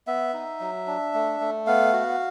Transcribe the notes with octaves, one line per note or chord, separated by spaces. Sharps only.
B3 E5
D#4
F#3
D4
A3
A3
B3 F5
F#4